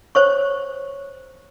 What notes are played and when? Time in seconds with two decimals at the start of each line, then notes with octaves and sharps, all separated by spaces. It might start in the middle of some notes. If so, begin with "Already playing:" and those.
0.15 C5 C#5 C#6